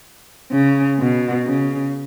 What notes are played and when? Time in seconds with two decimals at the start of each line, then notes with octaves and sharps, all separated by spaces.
0.52 C#3
1.00 B2
1.46 C#3